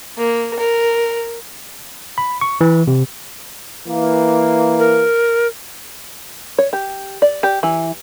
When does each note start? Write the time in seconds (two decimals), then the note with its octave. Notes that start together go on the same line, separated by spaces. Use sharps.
0.17 A#3
0.59 A#4
2.18 B5
2.41 C#6
2.61 E3
2.87 C3
3.88 E3 A#3
4.79 A#4
6.59 C#5
6.73 G4
7.22 D5
7.43 G4
7.63 E3